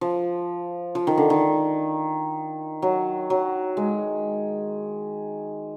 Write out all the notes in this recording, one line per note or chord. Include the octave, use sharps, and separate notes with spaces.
F3
F3
D#3
D3
D#3
F#3
F#3
G#3